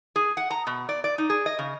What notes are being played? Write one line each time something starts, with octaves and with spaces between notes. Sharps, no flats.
G#4
F#5
A#5
B2
D5
D5
D#4
G#4
D#5
C#3